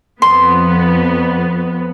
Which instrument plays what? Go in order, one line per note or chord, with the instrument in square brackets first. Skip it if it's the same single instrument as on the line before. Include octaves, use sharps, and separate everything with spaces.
[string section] F2 B3 [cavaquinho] C6